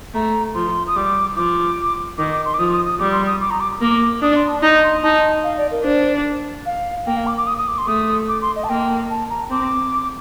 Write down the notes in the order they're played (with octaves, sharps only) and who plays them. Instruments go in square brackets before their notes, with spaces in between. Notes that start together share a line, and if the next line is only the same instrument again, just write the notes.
[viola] A3 [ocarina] A#5
[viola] F3 [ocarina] C6
[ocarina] D#6
[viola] G3 [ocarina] D6
[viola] F3 [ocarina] D6
[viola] D#3 [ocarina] D6
[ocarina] D6
C6
D6
[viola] F3 [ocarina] D#6
[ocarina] D#6
D#6
[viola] G3 [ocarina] D6
[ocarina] C6
D#6
D6
A#5
D6
[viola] A#3 [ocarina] D6
[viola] D4 [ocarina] D#6
[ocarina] C6
A5
[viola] D#4 [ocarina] A#5
[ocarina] C6
[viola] D#4 [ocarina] A5
[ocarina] F5
D5
A#4
[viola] D4 [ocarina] C5
[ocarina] F5
[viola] A#3 [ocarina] G5
[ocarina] F5
D6
D6
D#6
D#6
D6
C6
[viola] A3 [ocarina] D#6
[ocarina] D6
C6
D#5
A5
[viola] A#3 [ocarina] G5
[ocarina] A5
A#5
[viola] C4 [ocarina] D6